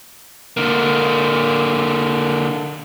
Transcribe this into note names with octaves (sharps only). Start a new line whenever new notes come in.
D3 A#3